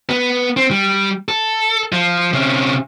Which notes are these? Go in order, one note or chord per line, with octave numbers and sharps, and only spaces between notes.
B3
C4
G3
A4
F3
C3 C#4